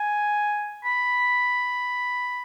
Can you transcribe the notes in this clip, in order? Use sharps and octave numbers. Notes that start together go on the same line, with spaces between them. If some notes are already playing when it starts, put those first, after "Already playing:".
Already playing: G#5
B5